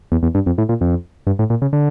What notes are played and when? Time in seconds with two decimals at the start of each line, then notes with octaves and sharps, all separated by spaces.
0.12 E2
0.23 E2
0.35 G2
0.46 F2
0.58 A2
0.69 A#2
0.81 F2
1.27 G2
1.39 A2
1.50 A#2
1.62 C#3
1.73 D3